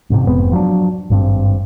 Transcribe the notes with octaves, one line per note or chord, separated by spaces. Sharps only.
A1 G#2 C3
F1 G#2 B3 C4
F3 F#3 C4 D4
G#1 G2 C4